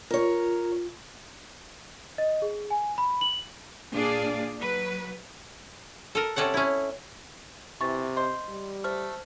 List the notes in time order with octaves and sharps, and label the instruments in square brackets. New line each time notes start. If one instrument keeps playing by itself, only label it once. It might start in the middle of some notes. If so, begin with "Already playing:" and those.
[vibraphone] F4 [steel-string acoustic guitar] A#4 C#5
[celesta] D#5
G#4
G#5
B5
F#7
[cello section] A#2 D4 G#4 D5 F5
F#3 B4
[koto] A4 A#4
C3 C#4 A4 D5 F#5
C#4 E4
[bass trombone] C3 [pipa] E3 [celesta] C#6 A6
[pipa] C5 [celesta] D#5
[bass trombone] G3
[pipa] A3 [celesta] C5 F6